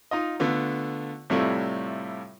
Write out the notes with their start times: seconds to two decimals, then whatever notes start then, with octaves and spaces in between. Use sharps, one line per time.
0.11 D#4 F4 D#5
0.40 D3 A3 B3 F4
1.30 A2 C3 G3 A3 E4 F4